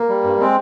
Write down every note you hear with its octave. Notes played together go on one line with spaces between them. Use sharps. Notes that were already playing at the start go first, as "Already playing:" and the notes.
Already playing: A#3
G3
G2
G#3 C4